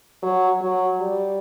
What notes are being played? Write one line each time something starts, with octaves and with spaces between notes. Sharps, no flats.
F#3
F#3
G3